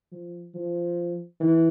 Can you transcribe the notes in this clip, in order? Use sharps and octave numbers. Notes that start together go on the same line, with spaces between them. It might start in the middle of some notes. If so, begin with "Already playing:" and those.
F3
F3
E3